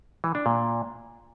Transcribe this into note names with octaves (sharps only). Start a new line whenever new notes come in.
E3
D4
A#2